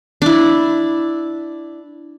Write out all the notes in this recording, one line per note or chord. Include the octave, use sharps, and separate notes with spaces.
D4 E4